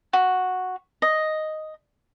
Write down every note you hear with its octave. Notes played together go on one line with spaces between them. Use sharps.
F#4
D#5